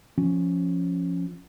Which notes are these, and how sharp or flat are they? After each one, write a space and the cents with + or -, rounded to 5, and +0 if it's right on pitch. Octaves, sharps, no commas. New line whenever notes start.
F3 +0 C#4 +0